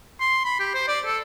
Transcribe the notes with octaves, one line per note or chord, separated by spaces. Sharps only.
C6
B5
G4
C5
D5
A4